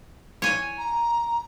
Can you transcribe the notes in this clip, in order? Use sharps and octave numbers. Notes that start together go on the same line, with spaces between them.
C#5 G#5
A#5